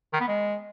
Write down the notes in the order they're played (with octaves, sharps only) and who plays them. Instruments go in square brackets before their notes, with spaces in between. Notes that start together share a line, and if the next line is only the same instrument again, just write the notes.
[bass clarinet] D#3
B3
G#3